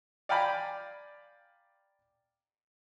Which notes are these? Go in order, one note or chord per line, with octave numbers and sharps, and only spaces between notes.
D5 F5 G5 G#5 A#5 B5